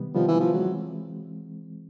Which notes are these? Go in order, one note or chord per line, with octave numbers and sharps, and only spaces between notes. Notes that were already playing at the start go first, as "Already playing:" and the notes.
Already playing: C3 D#3 G3 B3
C3 D#3 F3 G3 B3
E3
F3
E3 F#3 G#3 C4